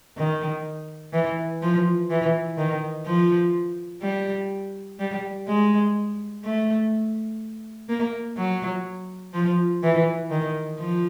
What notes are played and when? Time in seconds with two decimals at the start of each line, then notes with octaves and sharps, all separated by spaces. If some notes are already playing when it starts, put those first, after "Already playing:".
0.17 D#3
1.13 E3
1.62 F3
2.10 E3
2.58 D#3
3.06 F3
4.02 G3
5.00 G3
5.48 G#3
6.45 A3
7.89 A#3
8.37 F#3
9.34 F3
9.83 E3
10.31 D#3
10.79 F3